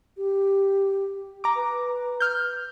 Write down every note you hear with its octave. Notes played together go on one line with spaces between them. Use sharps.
G4
A#5 D6
B4
F6 G6